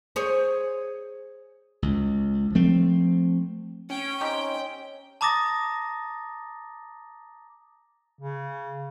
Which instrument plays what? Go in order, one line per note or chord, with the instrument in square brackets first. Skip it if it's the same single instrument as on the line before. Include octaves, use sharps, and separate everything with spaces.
[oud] G#4 C5 C#5
[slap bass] C#2
F3 A3 C4
[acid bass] C#4 [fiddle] G5
[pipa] C4 D#4 G4
[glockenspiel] A5 A#5 D6 D#6 A6 A#6
[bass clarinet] C#3